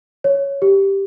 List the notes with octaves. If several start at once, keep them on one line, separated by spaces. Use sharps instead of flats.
C#5
G4